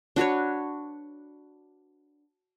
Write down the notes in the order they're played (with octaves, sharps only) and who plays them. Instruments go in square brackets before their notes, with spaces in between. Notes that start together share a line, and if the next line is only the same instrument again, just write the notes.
[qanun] D4 F#4 B4 C#5